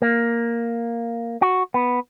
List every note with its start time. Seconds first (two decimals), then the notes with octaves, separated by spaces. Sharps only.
0.02 A#3
1.42 F#4
1.74 B3